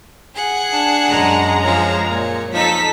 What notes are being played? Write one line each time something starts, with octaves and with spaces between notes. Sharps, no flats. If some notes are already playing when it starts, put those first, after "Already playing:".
G#4 F#5
D4
F#2 G#3 A#5
F3 G#4 C#5
A#2 C#5
F3 D#4 A4 B6